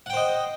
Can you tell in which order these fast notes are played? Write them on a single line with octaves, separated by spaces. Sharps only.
F#5 G5 C5 D#5